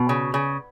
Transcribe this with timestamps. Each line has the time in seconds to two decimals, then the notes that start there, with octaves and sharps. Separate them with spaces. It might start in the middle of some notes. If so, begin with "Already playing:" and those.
Already playing: B2
0.09 C#3
0.34 C#3